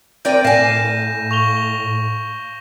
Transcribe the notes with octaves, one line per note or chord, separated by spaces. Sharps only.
C4 A#4 D5 G5 G6 D#7
A2 F5 G#5 A#6 E7
C#6 F7 G7